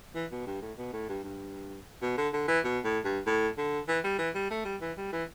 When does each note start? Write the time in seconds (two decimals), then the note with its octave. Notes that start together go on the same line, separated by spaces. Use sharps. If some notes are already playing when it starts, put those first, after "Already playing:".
0.15 E3
0.31 B2
0.47 G2
0.62 A2
0.78 B2
0.93 A2
1.09 G2
1.24 G2
2.02 B2
2.17 D3
2.33 D3
2.48 E3
2.64 B2
2.84 A2
3.05 G2
3.26 A2
3.58 D3
3.88 E3
4.04 G3
4.19 E3
4.35 G3
4.50 A3
4.65 G3
4.81 E3
4.97 G3
5.13 E3